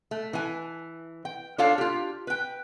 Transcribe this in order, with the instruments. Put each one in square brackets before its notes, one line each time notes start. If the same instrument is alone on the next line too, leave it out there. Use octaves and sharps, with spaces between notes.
[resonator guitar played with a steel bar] A3
E3 G#5
G5
D4 F4 A4 C#5 F5
F4 G4
B4 G5